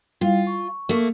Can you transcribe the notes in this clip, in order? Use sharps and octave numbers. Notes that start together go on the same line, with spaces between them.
G3 E4 F4 F5
C#6
A3 A#3